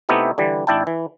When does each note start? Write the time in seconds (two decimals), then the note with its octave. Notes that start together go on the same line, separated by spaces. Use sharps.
0.09 C3 A3 B3 D#4 E4 G4
0.38 D3 E3 G3
0.67 G#1 D4 E4 G5 A5
0.87 E3